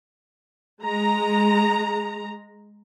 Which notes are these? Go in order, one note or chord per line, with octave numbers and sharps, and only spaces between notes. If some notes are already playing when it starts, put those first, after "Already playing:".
G#3 A#5